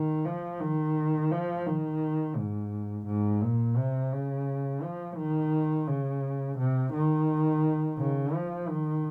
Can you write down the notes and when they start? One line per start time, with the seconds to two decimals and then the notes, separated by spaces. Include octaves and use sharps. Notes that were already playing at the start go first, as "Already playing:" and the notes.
Already playing: D#3
0.25 F3
0.60 D#3
1.31 F3
1.66 D#3
2.36 G#2
3.06 G#2
3.42 A#2
3.77 C3
4.12 C#3
4.82 F3
5.17 D#3
5.88 C#3
6.58 C3
6.93 D#3
7.98 C#3
8.34 F3
8.69 D#3